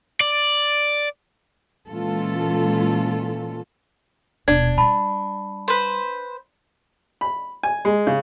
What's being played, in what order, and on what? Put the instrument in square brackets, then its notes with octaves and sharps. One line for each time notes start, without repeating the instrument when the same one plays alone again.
[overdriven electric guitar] D5
[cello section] A#2 E3 G#3 C#4 F4 A4
[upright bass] D#1 B2 [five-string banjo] D4 [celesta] G#6
[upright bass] G3 [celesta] A5 B5
[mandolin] B4 C5
[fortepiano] B5
G#5
G#3
C#3